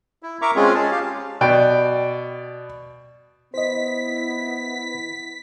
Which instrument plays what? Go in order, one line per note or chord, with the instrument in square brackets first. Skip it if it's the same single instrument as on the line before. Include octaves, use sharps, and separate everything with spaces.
[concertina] E4
A#4 E5 A#5 C#6 D6
G#3 C4 C#4 F4 G#4
C#4 A5
G4 F5
[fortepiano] B2 D5 G5
[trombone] B3 [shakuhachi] E4 [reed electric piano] C5 D#5 [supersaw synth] B6